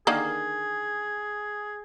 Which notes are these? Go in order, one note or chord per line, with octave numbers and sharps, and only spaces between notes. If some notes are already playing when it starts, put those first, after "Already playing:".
D3 D#3 A#3 G#4